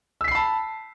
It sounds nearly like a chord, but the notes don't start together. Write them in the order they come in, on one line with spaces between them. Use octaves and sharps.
E6 B6 C7 B5 A5